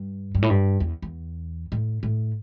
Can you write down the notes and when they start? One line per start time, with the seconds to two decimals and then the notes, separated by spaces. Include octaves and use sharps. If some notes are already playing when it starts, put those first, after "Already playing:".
Already playing: G2
0.35 G2
0.42 A2
0.50 G2
0.80 E2
1.02 E2
1.72 A2
2.03 A2